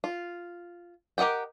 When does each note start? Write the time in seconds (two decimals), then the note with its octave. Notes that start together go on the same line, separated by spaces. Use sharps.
0.04 F4
1.18 G4 A#4 D#5 F#5 G5